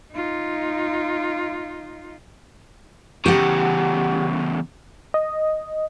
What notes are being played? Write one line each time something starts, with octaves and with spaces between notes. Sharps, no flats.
D#4 F4
E2 C#3 G4 F#5
D#5